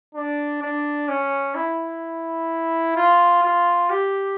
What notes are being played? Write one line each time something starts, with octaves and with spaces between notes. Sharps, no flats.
D4
D4
C#4
E4
F4
F4
G4